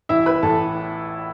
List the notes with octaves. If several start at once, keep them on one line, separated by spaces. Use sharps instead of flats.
A1 E4 E5
B4 B5
A2 E3 A4 A5